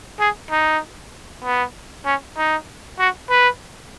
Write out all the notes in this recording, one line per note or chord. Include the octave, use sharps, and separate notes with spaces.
G#4
D#4
B3
C#4
D#4
F#4
B4